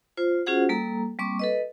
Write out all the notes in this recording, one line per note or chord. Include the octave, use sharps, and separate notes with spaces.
F4 C5
C#4 F4 F#4 G#4 C5 F#5
G3 A#3 A4 A#5
G3 A#3 C4 C#6 D6
A4 B4 D#5